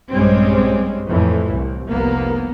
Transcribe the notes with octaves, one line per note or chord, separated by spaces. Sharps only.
A#1 G2 G3 G#3 C4 C#4
F2 A2 E3
C2
F1 C2 A#3 B3